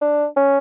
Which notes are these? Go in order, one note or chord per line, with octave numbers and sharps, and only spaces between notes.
D4
C#4